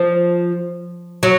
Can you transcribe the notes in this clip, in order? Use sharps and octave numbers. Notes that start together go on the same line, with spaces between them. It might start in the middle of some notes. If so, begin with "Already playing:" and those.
Already playing: F3
F#3